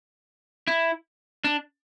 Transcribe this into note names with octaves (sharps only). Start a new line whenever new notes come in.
E4
D4